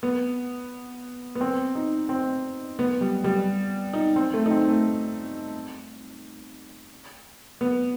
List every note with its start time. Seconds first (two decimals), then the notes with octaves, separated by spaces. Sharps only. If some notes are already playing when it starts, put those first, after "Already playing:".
0.03 B3
1.35 B3
1.41 C4
1.75 D#4
2.09 C4
2.79 B3
3.01 G3
3.24 G3
3.93 D#4
4.16 C4
4.33 A3
4.46 D#4
4.51 C4
4.68 A3
7.61 B3